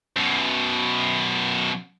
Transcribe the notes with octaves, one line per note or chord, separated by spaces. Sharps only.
F#2 B2